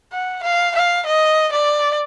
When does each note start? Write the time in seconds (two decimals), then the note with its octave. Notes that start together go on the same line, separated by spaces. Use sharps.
0.13 F#5
0.43 F5
0.75 F5
1.06 D#5
1.53 D5